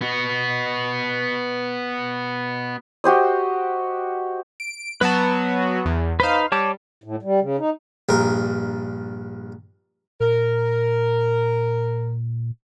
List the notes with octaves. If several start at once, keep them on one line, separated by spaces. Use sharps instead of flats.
B3 F#4
F#4 G4 C5 D#5
D7
F#3 B3 F#4 B4 A5
E2
D#4 B4 C5 F5
G3 C#5 A5 D6
A2
G3
C#3
D#4
A#1 G2 A#4
A#2 A#4